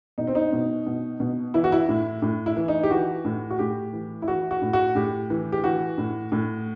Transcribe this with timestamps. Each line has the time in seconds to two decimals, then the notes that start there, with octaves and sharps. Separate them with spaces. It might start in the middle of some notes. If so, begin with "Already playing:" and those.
0.18 B2 D#4
0.27 C4
0.35 D#4
0.53 B2
0.87 B2
1.20 B2
1.54 E3 E4
1.64 F#4
1.72 E4
1.89 A2
2.22 A2
2.46 E4
2.56 E3
2.68 D#4
2.83 G4
2.90 E3 F#4
3.25 A2
3.50 F#4
3.59 A2 G4
3.93 E3
4.22 E4
4.27 E3 F#4
4.51 F#4
4.62 A2
4.73 F#4
4.95 A2 G4
5.30 E3
5.52 G4
5.64 E3 F#4
5.98 A2
6.32 A2